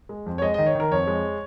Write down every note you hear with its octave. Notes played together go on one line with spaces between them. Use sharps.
G#3
F2
C#5
G#3 D#5
D#3 D#5
C#5
D#3 A#4
F2 C#5
G#3